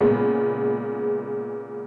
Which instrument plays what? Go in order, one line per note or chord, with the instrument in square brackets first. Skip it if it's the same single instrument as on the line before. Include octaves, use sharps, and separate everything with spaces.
[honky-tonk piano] A#2 C#3 G#3 B3